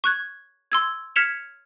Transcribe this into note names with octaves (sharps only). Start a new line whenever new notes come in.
C#6 F#6 G#6
C6 E6 G#6
F6 G#6 B6 C#7 E7 F7